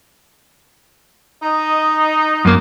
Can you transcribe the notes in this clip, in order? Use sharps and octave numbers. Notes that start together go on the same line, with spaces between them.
D#4 D#5
F#2 A#3